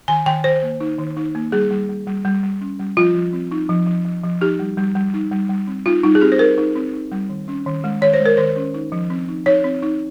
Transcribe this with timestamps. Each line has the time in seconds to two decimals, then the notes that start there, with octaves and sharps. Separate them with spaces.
0.08 D#3 G#5
0.26 D#3 G5
0.44 D#3 C5
0.63 A#3
0.80 D#4
0.99 D#3
1.17 D#4
1.35 A#3
1.52 G3 G#4
1.71 G3
1.89 G3
2.07 G3
2.25 G3
2.43 G3
2.61 C#4
2.79 G3
2.97 F3 F4
3.15 F3
3.33 C4
3.51 D#4
3.69 F3
3.87 F3
4.05 F3
4.23 F3
4.41 D#4 G4
4.59 G3
4.77 G3
4.95 G3
5.14 D#4
5.32 G3
5.49 G3
5.67 C4
5.86 D#4 F4
6.04 G3 D#4
6.15 G#4
6.21 C4 G4
6.32 C5
6.39 D#4 A#4
6.58 D#4
6.76 C4
6.94 D#4
7.12 G3
7.30 D#3
7.48 C#4
7.66 D#3
7.84 G#3
8.02 D#3 C#5
8.14 C5
8.20 G#3
8.26 A#4
8.37 D#3 C5
8.56 C#4
8.74 D#4
8.92 F3
9.10 C4
9.29 D#4
9.46 D#4 C#5
9.64 C4
9.82 D#4